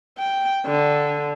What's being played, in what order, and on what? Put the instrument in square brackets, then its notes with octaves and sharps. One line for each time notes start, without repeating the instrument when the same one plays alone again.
[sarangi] G5
D3